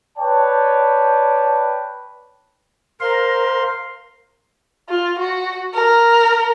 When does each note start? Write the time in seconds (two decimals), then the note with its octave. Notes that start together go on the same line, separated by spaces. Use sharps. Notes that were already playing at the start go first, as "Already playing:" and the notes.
0.18 B4 C#5 D5 G5 A5
3.00 A#4 C5 F5 C6
4.89 F4
5.19 F#4
5.74 A#4